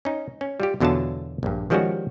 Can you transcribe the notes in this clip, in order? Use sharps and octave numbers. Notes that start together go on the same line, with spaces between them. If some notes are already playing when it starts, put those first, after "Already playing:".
C#4 D#4
C#4
G3 F4 G4
E2 B2 D3 F#3 F4 A5
A#1 G2
D#3 F3 G3 G#3 C#4 F#4